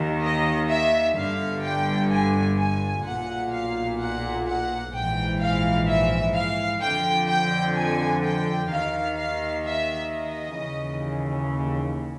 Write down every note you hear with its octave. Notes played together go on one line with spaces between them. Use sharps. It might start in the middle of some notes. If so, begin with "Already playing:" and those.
Already playing: D#2 D#3
D#5
E5
G1 G2 D3 F5
G5
G#5
G#5
B1 A#2 F#5
F5
F#5
F#5
A#1 G#2 E3 G5
F5
E5
F5
F2 D3 G5
G5
G#5
G5
D#2 D#3 F5
F5
E5
D#5
D#2 C#3 E3